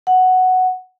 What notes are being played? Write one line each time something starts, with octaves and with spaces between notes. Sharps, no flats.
F#5